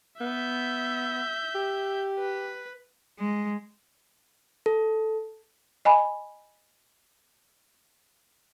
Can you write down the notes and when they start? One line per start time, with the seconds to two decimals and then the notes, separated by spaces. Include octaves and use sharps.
0.21 B3 E5 G6
1.55 G4
2.19 B4
3.19 G#3
4.66 A4
5.85 D#5 G#5 B5